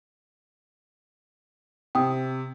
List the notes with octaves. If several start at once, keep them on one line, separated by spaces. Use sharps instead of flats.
C3 G5 D#6